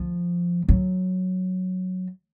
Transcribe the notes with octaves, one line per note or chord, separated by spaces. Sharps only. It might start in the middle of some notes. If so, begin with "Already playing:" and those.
Already playing: F3
F#3